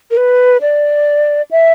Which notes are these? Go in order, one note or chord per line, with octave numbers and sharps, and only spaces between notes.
A#4
B4
D5
E5